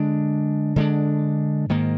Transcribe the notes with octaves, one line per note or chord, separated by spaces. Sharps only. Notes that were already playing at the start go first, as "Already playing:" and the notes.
Already playing: D3 G#3 D4
D3 G#3 D4
G#2 D#3 A#3